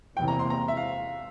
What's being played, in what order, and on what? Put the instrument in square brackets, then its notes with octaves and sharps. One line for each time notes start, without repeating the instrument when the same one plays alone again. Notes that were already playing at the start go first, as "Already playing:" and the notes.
[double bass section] E2 C3 E3 A#3 [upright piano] G5
[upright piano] A#5
C6
A#5
E5
F5